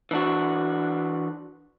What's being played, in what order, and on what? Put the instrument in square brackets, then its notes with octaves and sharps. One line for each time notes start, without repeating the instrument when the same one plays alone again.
[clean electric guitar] E3 D4 F#4